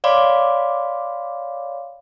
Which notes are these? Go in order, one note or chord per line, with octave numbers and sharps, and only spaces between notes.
C#5 D5 F5 B5 C6 D6